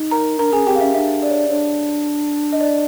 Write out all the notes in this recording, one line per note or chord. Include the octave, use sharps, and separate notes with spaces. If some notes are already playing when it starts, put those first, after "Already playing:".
Already playing: D#4
A#4 A#5
D4 A#4 A#5
C#4 G#4 G#5
C4 G4 G5
F5
C#4 E5
D4 E5
D5
C#5
D5
D4 C#5
D#5
D5